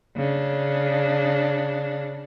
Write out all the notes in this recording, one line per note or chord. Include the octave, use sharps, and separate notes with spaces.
C#3 D4